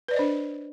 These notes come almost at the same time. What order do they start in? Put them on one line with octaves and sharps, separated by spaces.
B4 D5 D#5 C5 D4